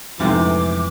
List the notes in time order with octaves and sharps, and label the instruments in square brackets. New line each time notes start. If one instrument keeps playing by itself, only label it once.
[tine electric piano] F2 [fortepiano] G#2 C3 A3 [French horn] E3 [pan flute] D6